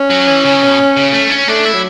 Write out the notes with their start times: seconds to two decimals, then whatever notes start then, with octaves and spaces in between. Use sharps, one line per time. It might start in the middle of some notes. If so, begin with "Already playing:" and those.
Already playing: C#4
0.10 F#3
0.27 E3
0.44 C#3
0.62 B2
0.97 C#3
1.13 A3
1.30 C#4
1.48 A3 D4
1.65 E4
1.74 F#3